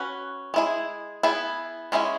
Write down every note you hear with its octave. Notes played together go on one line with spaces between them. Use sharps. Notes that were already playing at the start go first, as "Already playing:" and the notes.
Already playing: C#4 F#4 B4
G#3 E4 G#4
B3 E4 G#4
G#3 C#4 E4 G#4